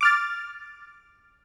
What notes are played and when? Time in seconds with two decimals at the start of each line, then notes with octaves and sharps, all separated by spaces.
0.01 D6 F6 A6